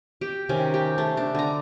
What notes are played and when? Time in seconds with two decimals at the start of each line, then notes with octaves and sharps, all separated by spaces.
0.21 G4
0.49 C3 D#3 C#4
0.74 G4
0.98 A3
1.17 D4
1.35 D3 A#5